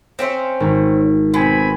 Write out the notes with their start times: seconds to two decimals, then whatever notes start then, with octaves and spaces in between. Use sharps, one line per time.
0.19 C4 C#4 C5 E5
0.60 G#1
1.34 B2 C4 G#5 B5